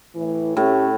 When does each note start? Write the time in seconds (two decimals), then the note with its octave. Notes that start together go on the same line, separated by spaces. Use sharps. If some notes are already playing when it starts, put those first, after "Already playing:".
0.15 A2 E3
0.57 A2 A3 C#4 G4